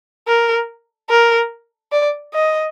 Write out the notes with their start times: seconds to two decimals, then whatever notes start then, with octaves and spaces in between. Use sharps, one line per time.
0.27 A#4
1.09 A#4
1.92 D5
2.34 D#5